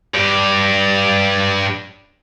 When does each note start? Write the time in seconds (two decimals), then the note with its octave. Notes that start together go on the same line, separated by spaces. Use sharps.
0.14 G2 G4